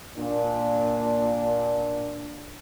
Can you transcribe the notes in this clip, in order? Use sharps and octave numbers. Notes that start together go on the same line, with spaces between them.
A#2 D4